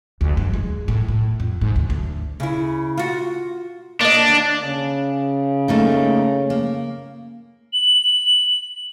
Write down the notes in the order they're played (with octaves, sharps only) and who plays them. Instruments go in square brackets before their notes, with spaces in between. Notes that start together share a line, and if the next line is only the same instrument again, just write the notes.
[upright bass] D2
G2
G#3
A2
A2
F2
G#2
D2
D2
[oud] C#3 E4
F4 F#4
[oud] A#3 D#5 [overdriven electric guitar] D4
[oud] D#2
[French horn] C#3
[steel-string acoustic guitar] A3 A#3 D#4
A#3
[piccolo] F#7